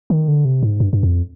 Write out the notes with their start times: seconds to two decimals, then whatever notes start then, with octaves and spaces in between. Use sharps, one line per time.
0.10 D#3
0.28 D3
0.45 C3
0.63 G#2
0.80 G2
0.93 G2
1.03 F2